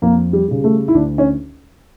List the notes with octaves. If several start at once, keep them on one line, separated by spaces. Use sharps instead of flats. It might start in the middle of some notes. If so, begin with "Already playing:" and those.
F2 A#3
G3
C#3 G3
A3
E4
D2 D4
C#4